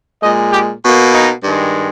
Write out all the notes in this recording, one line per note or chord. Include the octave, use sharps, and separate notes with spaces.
A#2 G#3 D#5
G4
B2 A#3
D#4
G2 D#3 G#3